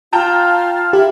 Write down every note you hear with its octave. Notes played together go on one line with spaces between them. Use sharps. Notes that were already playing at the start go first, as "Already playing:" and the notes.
F4 G5 A5 A#5
E4 G4